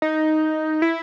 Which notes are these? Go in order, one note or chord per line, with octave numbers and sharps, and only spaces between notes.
D#4
E4